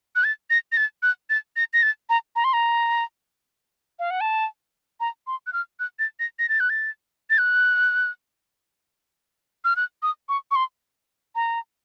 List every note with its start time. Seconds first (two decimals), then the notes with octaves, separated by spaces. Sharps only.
0.15 F#6
0.24 A6
0.50 A#6
0.72 A#6
0.77 A6
1.02 F#6
1.30 A6
1.56 A#6
1.73 A#6
1.82 A6
2.09 A#5
2.36 A#5
2.44 C6
2.53 A#5
3.99 F5
4.10 F#5
4.21 A5
5.00 A#5
5.27 C6
5.47 F#6
5.53 F6
5.79 F#6
5.99 A6
6.19 A#6
6.39 A#6
6.49 A6
6.60 F#6
6.70 A6
7.30 A6
7.38 F#6
9.64 F6
9.76 F#6
10.02 D#6
10.29 C#6
10.51 C#6
10.55 C6
11.35 A#5